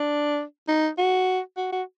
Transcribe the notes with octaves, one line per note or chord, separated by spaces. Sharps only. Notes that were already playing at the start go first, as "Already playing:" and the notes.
Already playing: D4
D#4
F#4
F#4
F#4